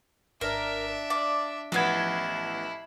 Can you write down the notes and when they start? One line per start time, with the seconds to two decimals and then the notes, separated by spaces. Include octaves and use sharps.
0.41 G#1 D4 A#4 D5 E5
1.10 D5 F5 A5
1.72 A1 F3 B3 E4 A4 G#6 C7